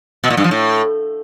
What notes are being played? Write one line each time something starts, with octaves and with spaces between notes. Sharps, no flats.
B2
A#2
G2
F3
A2